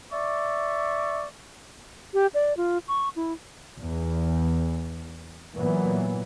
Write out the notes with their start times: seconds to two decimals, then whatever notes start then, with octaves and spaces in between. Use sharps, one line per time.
0.12 D5 E5 C#6
2.14 G4
2.34 D5
2.57 F4
2.88 C#6
3.16 E4
3.79 E2
5.56 A#2 E3 F#3 B3